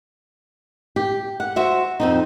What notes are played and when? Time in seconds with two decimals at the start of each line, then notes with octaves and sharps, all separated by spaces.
0.96 G4
1.40 F#5
1.56 F#4 C5 E5
2.00 F2 C4 D#4